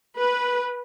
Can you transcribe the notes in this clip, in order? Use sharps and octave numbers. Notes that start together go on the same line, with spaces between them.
B4